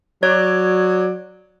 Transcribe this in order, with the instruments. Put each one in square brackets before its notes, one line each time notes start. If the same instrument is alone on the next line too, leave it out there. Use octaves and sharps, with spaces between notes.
[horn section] F#3 D5 [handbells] C#5